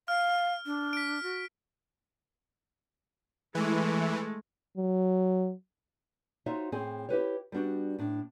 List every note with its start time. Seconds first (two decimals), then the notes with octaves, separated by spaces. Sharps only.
0.08 F5 F6
0.66 D4
0.93 B6 D7
1.23 F#4
3.55 E3 G#3 A3
4.77 F#3
6.46 D#4 F4 F#4 C5 C#5 E5
6.72 A2 C4 G#4 C#5 G#5
7.09 E4 G4 B4 C#5
7.52 G3 B3 D4 F#4 G4
7.99 A2 D4